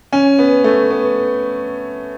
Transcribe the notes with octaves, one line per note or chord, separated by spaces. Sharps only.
C#4
B3
A3
B3